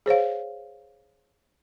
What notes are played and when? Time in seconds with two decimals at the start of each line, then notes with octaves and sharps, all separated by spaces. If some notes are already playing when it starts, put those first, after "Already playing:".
0.06 G#4 C5 C#5 F5